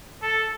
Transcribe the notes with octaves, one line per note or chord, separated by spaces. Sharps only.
A4